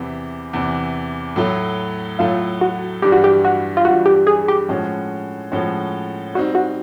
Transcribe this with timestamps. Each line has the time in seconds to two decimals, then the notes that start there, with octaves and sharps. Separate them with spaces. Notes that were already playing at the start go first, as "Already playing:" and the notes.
Already playing: E2 C3 E3
0.53 E2 C3 E3
1.36 A2 F#3 A3
2.19 A2 F#3 A3 F4
2.61 F#4
3.02 G2 E3 G3 G4
3.12 F#4
3.24 G4
3.45 F#4
3.77 F4
3.85 G2 E3 G3 F#4
4.06 G4
4.27 G#4
4.48 G4
4.69 A2 F3 G#3 C#4 F#4
5.52 A2 F3 G#3 C#4 F#4
6.34 G3 C4 D#4 F#4
6.55 F#4